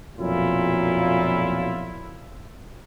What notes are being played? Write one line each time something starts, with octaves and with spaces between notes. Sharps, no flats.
B1 F2 A#2 F#3 E4 F4